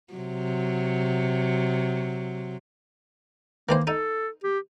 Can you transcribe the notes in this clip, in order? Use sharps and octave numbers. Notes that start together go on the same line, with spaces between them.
C3 F#3
D#3 E3 A#3 C5
D#4 A4
G4